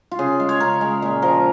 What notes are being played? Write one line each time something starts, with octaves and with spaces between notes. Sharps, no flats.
F4
C#3 G#4
G#3
C#5
C#3 A#4
G#3
A#2
F3 A#4